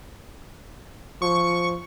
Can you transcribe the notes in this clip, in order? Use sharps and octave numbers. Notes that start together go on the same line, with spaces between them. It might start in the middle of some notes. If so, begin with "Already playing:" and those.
F3 C#6